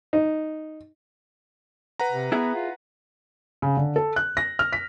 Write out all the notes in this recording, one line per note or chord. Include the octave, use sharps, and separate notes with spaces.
D#4
B4 F#5 A#5
C3
B3 E4 G#4 E5
F4
C#3
D3
A4
F#6
A#6
F6
B6